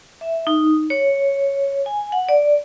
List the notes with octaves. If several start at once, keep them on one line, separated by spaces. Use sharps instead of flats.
E5
D#4
C#5
G#5
F#5
D5